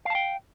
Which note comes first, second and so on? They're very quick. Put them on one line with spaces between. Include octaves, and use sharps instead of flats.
F5 A5 G5